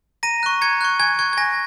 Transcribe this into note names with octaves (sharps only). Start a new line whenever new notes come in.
A#5 A#6 D#7
C#6 F#6
A#5 G#6 C#7
C#6 F#6
G#5 G#6
C#6 F#6 G#6
G#6
G#5 A#6